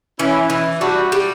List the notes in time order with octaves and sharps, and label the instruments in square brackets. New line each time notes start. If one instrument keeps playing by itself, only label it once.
[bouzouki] E3 [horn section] C#4 E4
[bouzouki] E3
[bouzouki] G3 [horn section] D4 F#4
[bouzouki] G3